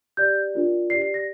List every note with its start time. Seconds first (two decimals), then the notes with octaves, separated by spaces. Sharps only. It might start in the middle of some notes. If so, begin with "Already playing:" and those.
0.17 G4 D5 G6
0.54 D4 F4 A#4 D5
0.90 G4 D5 C7
1.02 C7
1.14 A#6